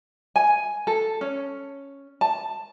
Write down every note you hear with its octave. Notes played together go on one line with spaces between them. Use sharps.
G#5
A4
C#4
A5